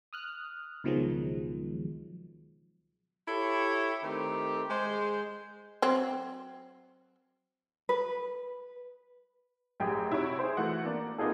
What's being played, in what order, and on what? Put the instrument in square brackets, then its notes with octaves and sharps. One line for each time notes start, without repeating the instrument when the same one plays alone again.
[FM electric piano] D#6 F6 F#6
C#2 B2 D#3 F3 F#3 G#3
[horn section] E4 G4 A4 C#5
D#3 A3 C4 G4
G#3 C5
[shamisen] F#3 C4
[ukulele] B4
[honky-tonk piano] A1 F#2 G4 G#4 G5
C3 E4 F#4 C#5 D7
G#4 C5
E3 A3 F#4 F#5
A#3 D4 D5
A#3 B3 D#4 F4 G#4 A4